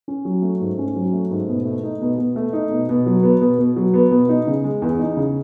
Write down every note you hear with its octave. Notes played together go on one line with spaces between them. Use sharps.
C#4
F#3
A3
G#2
C#4
F#3
A3
G#2
B2
A3
D#4
B2
B2
A3
D#4
B2
B2
F#3
B3
B2
B2
F#3
B3
B2
D#4
C#3
G#3
E2
D#4
C#3